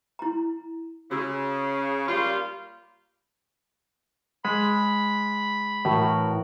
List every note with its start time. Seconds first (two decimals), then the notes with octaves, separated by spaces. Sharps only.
0.19 E4 A#5
1.11 C#3 F#4 E6
2.08 G3 A#3 F4 G4 B5
4.45 G#3 B5
5.85 A2 E3 F#4 A#4